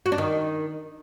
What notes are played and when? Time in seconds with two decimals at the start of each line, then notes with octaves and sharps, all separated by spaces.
0.06 F#4
0.12 D4
0.18 D#3